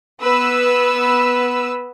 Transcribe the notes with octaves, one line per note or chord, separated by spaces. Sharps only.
B3 B4 E6